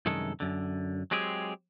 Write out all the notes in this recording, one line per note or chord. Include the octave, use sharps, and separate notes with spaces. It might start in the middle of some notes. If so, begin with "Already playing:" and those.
C2 F#2 D#3 G#3 A4
F#2 D3
F#3 G#3 C4 G4 G#4